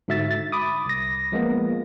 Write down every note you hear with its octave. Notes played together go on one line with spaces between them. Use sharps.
G#2 D3 F#4 E5 E6 A6
A6
B5 D6 D#6
C2 A#6
F3 G#3 A#3 B3